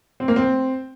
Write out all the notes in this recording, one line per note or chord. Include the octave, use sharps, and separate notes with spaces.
C4
A#3
C4